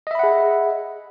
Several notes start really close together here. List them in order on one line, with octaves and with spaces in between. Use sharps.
D#5 E5 B5 F#5 G#4